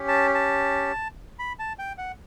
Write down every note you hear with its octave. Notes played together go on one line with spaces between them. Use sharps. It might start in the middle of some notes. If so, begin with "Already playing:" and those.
Already playing: C#4 G4
A5
A5
B5
A5
G5
F#5